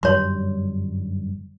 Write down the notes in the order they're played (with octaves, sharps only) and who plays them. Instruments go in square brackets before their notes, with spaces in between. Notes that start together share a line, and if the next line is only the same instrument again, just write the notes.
[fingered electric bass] G1 F#2 G3 [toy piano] C#5 C6